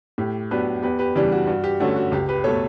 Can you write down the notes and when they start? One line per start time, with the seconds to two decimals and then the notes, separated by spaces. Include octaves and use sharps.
0.18 A2 G4
0.51 F#3 B3 D4 G4 B4
0.83 E2 G4 B4
0.99 G4 B4
1.15 C#3 E3 G3 D4 G4
1.32 F#4
1.47 G2 F#4
1.64 G4
1.80 D3 A3 C#4 F#4
1.96 F#4
2.12 C#2 G4
2.29 G4 B4
2.44 B2 A3 A4 C#5